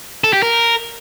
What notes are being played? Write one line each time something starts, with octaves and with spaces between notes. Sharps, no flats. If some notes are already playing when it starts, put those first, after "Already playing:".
A4
G4
A#4